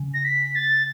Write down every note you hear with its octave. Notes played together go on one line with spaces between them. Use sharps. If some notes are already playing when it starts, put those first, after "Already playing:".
Already playing: C#3
A#6
B6
A6